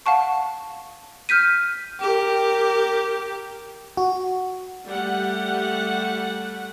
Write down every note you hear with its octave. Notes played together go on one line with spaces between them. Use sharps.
F5 F#5 A5 C#6
F6 G6 B6 D#7
G4 A#4
F#4
G3 A3 F#5